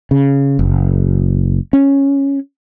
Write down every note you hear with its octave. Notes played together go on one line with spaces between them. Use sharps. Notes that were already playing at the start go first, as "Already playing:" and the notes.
C#3
F#1
C#4